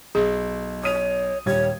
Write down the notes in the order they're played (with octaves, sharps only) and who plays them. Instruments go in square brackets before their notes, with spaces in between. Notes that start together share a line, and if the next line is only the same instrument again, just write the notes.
[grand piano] B1 [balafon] G#4
[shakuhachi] C#5 [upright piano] D#6 D#7 F7
[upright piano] D#1 G3 G#6 [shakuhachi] C#5